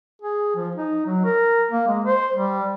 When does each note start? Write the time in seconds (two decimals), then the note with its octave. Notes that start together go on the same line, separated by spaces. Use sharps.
0.22 G#4
0.56 F3
0.75 D#4
1.06 F#3
1.25 A#4
1.71 A#3
1.88 G#3
2.04 C5
2.33 G3